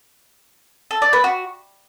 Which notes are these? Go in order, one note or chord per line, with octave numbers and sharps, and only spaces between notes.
A4
D5
B4
F#4